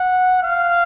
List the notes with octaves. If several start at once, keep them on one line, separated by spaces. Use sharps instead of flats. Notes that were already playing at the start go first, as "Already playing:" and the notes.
Already playing: F#5
F5